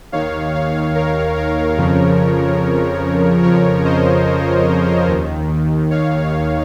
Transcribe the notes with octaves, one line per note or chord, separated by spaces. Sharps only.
D#2 D#3 C#5 F5
C#5 F5
A#4 C#5
A#4 C#5
F2 C#3 F3
F2 C#3 F3 A#4 C#5
C5 D#5
D#2 D#3
C#5 F5